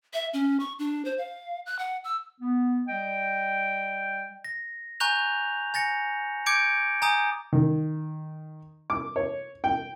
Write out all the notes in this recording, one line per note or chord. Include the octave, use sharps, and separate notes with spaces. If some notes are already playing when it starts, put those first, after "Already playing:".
E5
C#4
C#6
D4
C5
F5
F#6
F#5
E6
B3
G3 D#5 G5
A#6
G#5 A#5 C#6 F#6 G6 F7
G#5 A6 A#6 C#7
D6 G6 G#6 C#7 D7
G#5 A#5 D#6 G6
D#3
D6
C#5
G5